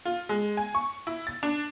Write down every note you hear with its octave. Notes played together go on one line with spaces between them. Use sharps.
F4
G#3
G#5
C#6
E4
A6
D4